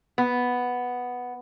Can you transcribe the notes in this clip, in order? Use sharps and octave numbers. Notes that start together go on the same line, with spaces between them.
B3